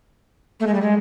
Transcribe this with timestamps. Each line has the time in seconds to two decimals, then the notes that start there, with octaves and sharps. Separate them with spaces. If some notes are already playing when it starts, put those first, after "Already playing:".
0.60 A3
0.67 G#3
0.74 G3
0.82 G#3